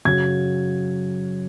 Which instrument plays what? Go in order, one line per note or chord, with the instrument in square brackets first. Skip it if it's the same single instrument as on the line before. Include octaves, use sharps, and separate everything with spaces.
[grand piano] F#2 C#3 F#3 G#6